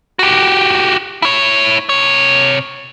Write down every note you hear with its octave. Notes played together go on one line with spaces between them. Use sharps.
F#4 G4
E4 C#5
C3 C#5